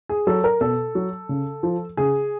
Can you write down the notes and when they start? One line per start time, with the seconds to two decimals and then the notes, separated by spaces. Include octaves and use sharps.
0.09 G#4
0.27 F#3 A4
0.44 A#4
0.61 B2 A4
0.95 F#3
1.29 C#3
1.63 F3
1.97 C#3 G#4